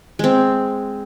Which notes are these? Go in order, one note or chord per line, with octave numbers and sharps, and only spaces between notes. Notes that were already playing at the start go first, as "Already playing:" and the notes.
G#3 C4